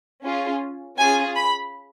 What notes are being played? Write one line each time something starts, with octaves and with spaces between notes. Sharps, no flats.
C#4 F4 G#4
C#4 F4 G#4 G#5
B5